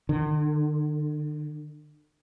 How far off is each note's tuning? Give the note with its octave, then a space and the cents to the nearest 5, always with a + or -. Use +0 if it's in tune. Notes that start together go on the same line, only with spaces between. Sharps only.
D3 +45